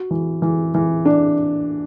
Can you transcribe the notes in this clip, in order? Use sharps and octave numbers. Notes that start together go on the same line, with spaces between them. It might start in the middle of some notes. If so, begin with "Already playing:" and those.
Already playing: F#4
E3
E3
E3
D4